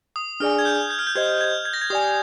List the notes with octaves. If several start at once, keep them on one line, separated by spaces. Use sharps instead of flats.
D#6
D4 G#4 D5 G#5 F6
G#6
G6
G6
F6
G6
G4 C5 D#5 G#6
G#6
G#6
A#6
G#6
G4 D5 G#5 D#6